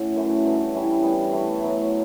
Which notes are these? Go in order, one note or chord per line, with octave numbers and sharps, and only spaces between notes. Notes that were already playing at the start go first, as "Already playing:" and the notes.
Already playing: A2 C#4 F#4
F#2 E3 A3
G2 F#3 C#4
E3 G3 C#4 E4
E3 G3 B3
E3 A3 E4
A2 F#3 B3